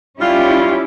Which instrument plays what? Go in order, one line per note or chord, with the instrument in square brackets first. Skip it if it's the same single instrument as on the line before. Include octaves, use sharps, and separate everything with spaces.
[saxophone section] G3 F4 [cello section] C#4 E4 G4